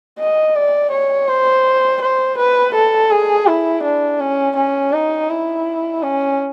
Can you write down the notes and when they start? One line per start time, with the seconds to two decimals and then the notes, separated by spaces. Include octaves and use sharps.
0.19 D#5
0.55 D5
0.91 C#5
1.28 C5
2.02 C5
2.37 B4
2.74 A4
3.11 G#4
3.47 E4
3.83 D4
4.20 C#4
4.56 C#4
4.93 D#4
5.29 E4
6.02 C#4